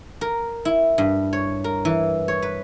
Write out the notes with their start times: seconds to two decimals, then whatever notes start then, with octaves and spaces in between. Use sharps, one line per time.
0.21 A#4
0.65 E4
0.98 G2
1.33 C#5
1.64 A#4
1.85 E3
2.28 C#5
2.42 B4